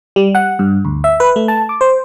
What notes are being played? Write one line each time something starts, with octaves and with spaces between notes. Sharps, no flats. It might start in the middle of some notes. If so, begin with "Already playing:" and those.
G3
F#5
G2
D2
E5
B4
A3
A5
D6
C5